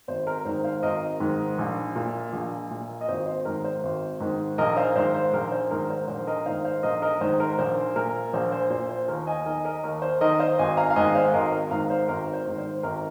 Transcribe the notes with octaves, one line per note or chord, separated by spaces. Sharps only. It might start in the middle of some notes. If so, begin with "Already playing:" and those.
G#1 C5
A#4
G#2 D#3 C5
C5 F5
G#1 A#4 D#5
G#2 D#3
A#1
A#2
A#1
A#2
D#5
G#1 C5
C5
G#2 D#3 A#4
C5
G#1
G#2 D#3
A#1 A#4 D#5
C5 F5
G#2 D#3 C5 F5
C5
A#1 A#4
C5
G#2 D#3 A#4
C5
A#1 C5
A#4 D#5
G#2 D#3 C5 F5
C5 F5
A#1 A#4 D#5
A#4 D#5
G#2 D#3 C5
A#4
A#1 C5
A#2 A#4
A#1 C5
C5
A#2 C5
C5
D#2 A#4
D#5 G#5
D#3 A#4 D#5
A#4 D#5
D#2 A#4
C5
D#3 A#4 D#5
C5 F5
G#1 D#5 G#5
F5 A#5
F5
G#2 D#3 D#5 G#5
C5 F5
G#1 A#4 D#5
A#4
G#2 D#3 F5 A#5
C5
G#1 A#4
C5
G#2 D#3
C5
G#1 A#4